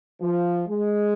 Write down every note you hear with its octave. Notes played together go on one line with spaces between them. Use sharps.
F3
G#3